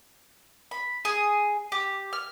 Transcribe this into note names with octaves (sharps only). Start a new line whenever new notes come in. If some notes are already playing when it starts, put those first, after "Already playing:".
B5
G#4
G4
F6